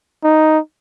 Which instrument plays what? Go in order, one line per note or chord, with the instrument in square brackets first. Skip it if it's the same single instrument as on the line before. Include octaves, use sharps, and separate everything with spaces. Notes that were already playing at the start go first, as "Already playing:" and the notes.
[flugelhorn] D#4